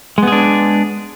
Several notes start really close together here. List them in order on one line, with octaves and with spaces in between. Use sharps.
G#3 B3 G#4 D4